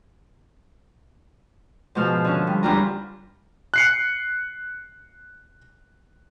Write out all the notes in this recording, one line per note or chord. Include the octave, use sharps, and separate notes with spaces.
G#2 B2 F3 F6
D3 C#4
G3
E2 G3 D4 F4 A#5
F#6 C7 C#7